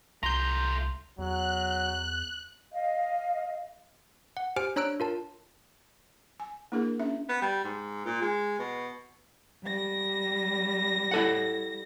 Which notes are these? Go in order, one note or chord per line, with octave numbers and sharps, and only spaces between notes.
C2 A3 F4 A#5 G6
E2 F#3 F#6
D#5 F5
F#5
G4 C5 G#5 F6 D7
D4 C#5 A#5 E6 F#6 D7
F4 A#4 A5
G#5
A#3 D4 E4 G#4 A#4
C#4 D4 E5
B3
G3
G#2
A#2
G#3
B2
G3 A#6
E4 A4 F#5